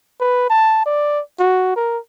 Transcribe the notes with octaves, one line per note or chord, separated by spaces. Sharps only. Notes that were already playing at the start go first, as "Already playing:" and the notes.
B4
A5
D5
F#4
A#4